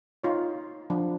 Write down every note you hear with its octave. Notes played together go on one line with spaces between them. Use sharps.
D#4 F4 C#5
F3 D4